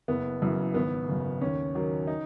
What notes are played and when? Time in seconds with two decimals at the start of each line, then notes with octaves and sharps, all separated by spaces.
0.08 F#1 B3
0.42 F#2 C#3 E3
0.74 G#1 B3
1.08 F#2 C#3
1.41 D#2 C#4
1.75 D#3 F#3
2.07 D#4